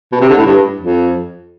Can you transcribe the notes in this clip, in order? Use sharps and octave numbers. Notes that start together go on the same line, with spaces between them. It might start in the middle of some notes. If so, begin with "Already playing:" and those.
B2
C3
D3
A2
G2
F2